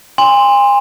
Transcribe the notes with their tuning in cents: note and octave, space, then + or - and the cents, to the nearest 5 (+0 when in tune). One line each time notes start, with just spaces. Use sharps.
G#5 -40 C6 +0